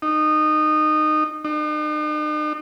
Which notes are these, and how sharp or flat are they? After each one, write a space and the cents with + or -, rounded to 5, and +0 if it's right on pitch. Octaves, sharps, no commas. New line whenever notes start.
D#4 -20
D#4 -45